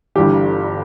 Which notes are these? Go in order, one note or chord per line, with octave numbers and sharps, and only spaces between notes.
G1 G2 E3 G4